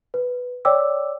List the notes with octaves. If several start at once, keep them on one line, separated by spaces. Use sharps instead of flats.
B4
C#5 D5 G5 D6 E6